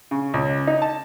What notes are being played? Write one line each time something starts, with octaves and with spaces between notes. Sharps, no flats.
C#3
C#2
D#4
A5